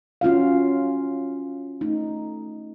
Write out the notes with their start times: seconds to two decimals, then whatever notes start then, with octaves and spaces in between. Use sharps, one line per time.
0.21 C#4 F4 F#4 F5
1.81 A3 D#4